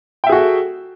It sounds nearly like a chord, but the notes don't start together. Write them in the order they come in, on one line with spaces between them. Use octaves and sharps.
G5 E5 G#4 F#4 A4